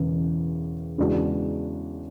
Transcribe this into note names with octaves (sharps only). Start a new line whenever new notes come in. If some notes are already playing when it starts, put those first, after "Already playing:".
Already playing: E1 E2 C#3 E3
E2 C#3 G#3 D4 F#4